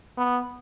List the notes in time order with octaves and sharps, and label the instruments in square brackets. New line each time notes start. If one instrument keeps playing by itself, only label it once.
[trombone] B3